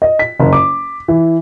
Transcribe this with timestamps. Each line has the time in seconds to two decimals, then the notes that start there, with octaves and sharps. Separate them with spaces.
0.02 D#5
0.19 B6
0.39 F#1
0.53 D6
1.08 E3